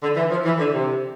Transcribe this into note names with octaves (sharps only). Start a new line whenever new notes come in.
D3
E3
F3
E3
D3
C3